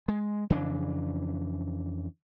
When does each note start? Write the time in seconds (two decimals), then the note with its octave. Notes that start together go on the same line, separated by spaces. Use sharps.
0.08 G#3
0.50 F2 C#3 E3 D4